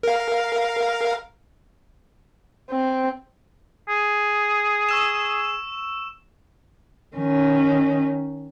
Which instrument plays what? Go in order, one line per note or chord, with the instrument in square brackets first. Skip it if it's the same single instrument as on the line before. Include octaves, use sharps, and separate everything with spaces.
[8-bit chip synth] A#4 F5
[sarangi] C4
[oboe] G#4
[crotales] C#6 E6 E7
[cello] D#3 C#4